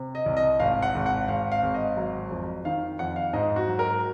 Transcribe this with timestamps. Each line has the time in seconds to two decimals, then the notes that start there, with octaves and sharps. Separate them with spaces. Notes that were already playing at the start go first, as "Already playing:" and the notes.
Already playing: C3
0.15 D#5
0.26 C2
0.37 D#5
0.60 G#1 F5
0.82 F#5
0.95 G#1
1.06 F#5
1.28 G#1 F5
1.52 F5
1.63 G#1
1.74 D#5
1.97 F#3
2.31 F2
2.65 D#3 F5
2.99 F2 F#5
3.16 F5
3.33 G#2 D#5
3.56 F#4
3.68 F#3
3.79 A#4